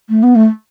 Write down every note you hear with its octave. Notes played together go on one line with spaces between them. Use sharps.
A3
B3
A3